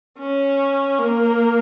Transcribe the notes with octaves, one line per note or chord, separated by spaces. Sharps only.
C#4
A#3